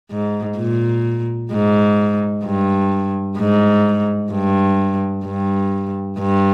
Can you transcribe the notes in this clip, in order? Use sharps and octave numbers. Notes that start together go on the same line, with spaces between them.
G#2
A#2
G#2
G2
G#2
G2
G2
G2